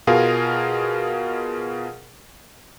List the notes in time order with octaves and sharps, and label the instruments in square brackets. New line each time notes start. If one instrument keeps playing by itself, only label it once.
[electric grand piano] B2 F4 G#4 A#4 F5